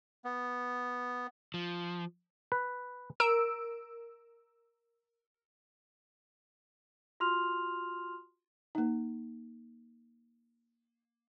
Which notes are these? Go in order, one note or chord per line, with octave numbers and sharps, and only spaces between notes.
B3
F3
B4
A#4 E6 D7
F4 F#4 C6 F6 F7
A#3 D#4